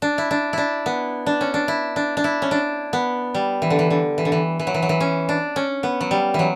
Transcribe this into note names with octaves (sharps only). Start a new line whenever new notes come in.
D4
E4
D4
D4 E4
B3
D4
C#4
D4
E4
D4
D4
E4
C#4
D4
B3
G3
E3
D3
E3
D3
E3
D3
E3
E3
F#3
E3
F#3
E3
C#4
D4
C#4
B3
F#3
G3
E3 F#3